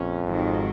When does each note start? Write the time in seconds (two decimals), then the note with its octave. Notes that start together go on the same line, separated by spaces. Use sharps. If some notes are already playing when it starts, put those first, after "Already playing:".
Already playing: A#1 F2 C#4
0.27 G#1 G#2 D#3 F#3